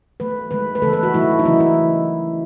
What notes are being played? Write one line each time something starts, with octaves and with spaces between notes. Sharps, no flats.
D#3 F#3 A3 B4
D#3 G#3 B4
B4
C#3 E3 A3 A4
B4
F#4
D#3 F#3 A3 E4
D#4
C#3 E3 A3 E4
E4